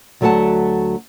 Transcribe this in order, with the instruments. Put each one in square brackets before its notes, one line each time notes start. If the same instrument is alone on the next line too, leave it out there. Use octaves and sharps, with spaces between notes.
[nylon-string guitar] D2 F#3 A3 F#4 F#5 A5